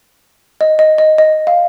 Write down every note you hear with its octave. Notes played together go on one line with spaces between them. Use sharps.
D#5
D#5
D#5
D#5
F5